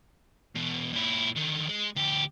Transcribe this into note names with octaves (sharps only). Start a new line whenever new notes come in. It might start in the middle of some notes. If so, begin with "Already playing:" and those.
E2 B2
A#2 E4
D3 D#3
G#3
D2 G4